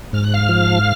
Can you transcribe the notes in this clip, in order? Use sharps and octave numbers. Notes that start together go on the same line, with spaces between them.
G#2 F6
F#6
F5 F6
F3